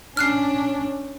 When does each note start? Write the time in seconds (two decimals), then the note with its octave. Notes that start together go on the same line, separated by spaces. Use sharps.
0.17 C#4 D4 F6 F#6 C7